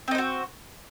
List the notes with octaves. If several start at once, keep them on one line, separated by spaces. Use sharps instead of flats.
C4 D#4 F#4 C5